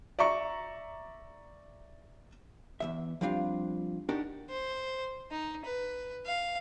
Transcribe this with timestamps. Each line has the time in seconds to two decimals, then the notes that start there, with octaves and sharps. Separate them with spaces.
0.19 D5 E5 A#5 C#6
2.80 E2 C#3 E5
3.21 F3 G3 C4 D4 F4
4.09 D4 D#4 F#4 G4 A#4
4.50 C5
5.31 D#4
5.65 B4
6.26 F5